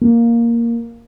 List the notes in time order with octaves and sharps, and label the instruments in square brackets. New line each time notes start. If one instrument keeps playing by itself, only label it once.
[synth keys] A#3